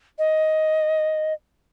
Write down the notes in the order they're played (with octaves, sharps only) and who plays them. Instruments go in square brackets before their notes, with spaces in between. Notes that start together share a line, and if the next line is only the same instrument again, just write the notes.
[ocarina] D#5